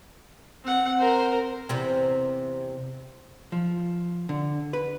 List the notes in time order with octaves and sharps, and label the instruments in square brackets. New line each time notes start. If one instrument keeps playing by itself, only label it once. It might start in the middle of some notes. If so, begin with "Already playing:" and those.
[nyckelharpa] C4 F#5
A#4 C5
[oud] E2 C3 C4
[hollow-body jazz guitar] F3
D3
B4